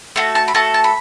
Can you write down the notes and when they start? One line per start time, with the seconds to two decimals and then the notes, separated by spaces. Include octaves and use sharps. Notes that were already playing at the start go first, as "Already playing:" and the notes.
0.16 A3 F#4 A4
0.35 A5
0.48 B5
0.54 A3 F#4 A4 A5
0.74 A5
0.84 B5